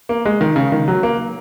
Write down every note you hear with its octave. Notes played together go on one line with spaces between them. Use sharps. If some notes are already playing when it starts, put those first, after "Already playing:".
A#3
G#3
D#3
C#3
D#3
F#3
A#3